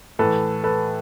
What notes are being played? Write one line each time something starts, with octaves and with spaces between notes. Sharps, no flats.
A2 E3 A4 B4
A4 B4